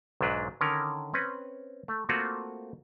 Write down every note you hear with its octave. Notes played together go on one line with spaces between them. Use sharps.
B1 G#2 F#3 D4 B4
D3 D#3 C#4 A#4
C4 C#4 B4
A3
A3 A#3 C4 F4 F#4